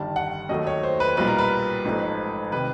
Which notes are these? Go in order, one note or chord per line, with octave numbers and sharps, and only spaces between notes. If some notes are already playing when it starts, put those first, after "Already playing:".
Already playing: G1 G2 D#3 G3 A5
F#5
D#2 D#3 F#3 A3 D#5
C#5
C5
B4
B1 A#2 G3 B4
A#4
B4
A1 G#2 F3 A3
C3 D#3 B4